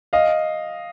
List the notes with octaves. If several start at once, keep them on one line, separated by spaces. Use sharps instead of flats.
D#5 F5